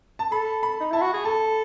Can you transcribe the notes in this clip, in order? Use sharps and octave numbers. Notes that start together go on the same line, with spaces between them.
A5
A4 B5
B5
D#4
E4 A5
F#4
G#4
A4 A5